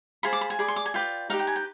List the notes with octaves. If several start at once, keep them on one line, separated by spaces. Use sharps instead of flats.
F4 G#4 C5 B5
D6
B5
G#5
G#4 D5 B5
C6
D6
G#5
F4 B4 D5 G5
D#4 G4 B4 F5
G5
G#5
G5